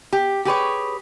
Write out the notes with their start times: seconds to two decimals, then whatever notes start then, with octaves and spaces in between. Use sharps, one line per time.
0.13 G4
0.45 G4 G#4 B4 C#5